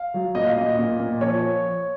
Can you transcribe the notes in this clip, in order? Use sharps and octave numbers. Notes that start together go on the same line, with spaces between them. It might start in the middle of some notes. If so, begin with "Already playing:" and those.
Already playing: F5
F#3
A#2 D#5
F5
A#2 D#5
A#2
A#2
F3 C#5